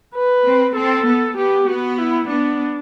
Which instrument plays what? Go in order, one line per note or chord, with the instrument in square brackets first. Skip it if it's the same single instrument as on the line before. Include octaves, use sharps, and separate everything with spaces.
[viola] B4
[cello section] C4
[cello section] C4 [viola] A4
[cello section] B3
[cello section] B3 [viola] G4
[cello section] B3 [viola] F#4
[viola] E4
[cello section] B3 [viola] D4